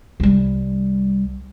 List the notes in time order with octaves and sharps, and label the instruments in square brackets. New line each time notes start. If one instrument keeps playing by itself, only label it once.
[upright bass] C2 G3